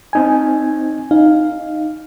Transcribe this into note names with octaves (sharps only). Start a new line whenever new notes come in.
C4 D#4 G#5
D#4 F5